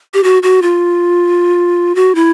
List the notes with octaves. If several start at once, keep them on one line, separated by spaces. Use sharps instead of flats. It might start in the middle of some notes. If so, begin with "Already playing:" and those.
G4
F#4
F#4
F4
F#4
E4